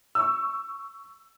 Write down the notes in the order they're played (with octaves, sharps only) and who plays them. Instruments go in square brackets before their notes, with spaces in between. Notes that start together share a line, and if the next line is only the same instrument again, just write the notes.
[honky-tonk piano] C#6 E6